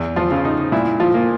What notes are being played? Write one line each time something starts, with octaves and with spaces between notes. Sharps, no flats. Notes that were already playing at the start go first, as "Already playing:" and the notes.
Already playing: E2
F3 F4
C#3
D#4
A#2 E4
F3 F4
A#3